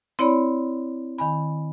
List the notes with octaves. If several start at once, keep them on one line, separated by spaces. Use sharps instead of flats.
C4 E4 C#5 D5 B5
D#3 G#5 B5